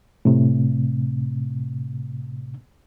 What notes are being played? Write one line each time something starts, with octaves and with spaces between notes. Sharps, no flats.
A2 C3